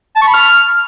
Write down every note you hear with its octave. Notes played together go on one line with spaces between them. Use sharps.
A5
C#6
B5
F6